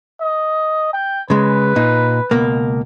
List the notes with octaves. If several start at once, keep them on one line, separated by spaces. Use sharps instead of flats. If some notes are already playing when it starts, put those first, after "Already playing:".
D#5
G5
C#3 G#3 B4
A#2 D#4
C#2 B2 A#3